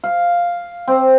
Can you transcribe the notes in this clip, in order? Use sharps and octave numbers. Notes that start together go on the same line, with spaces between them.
F5
C4